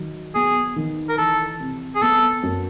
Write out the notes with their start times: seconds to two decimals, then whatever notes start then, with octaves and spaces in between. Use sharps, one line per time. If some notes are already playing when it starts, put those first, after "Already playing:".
Already playing: D#3 F#3
0.35 B3 G#4
0.76 D#3
1.09 A#4
1.18 E3 A4
1.60 C3
1.95 G#4
2.02 B3 A4
2.43 F#2